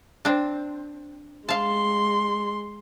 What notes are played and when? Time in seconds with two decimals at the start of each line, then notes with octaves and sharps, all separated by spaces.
0.25 C4 D4
1.49 G#3 F5 A5 C6